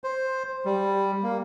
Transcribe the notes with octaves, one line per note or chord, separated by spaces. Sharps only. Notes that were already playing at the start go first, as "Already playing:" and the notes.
C5
G3
A#3